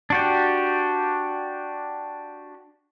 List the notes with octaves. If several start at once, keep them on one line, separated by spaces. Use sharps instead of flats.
D4 F#4 G4